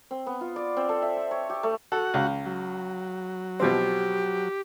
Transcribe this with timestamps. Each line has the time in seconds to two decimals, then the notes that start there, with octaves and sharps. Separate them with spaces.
0.11 C4
0.26 B3
0.41 F4
0.56 D5
0.77 C4
0.89 A4
1.02 E5
1.17 C5
1.31 C#5
1.50 G4
1.63 A3
1.92 F#4 A4 F#5
2.14 C#2
2.45 F#3
3.60 B2 F3 C4 G4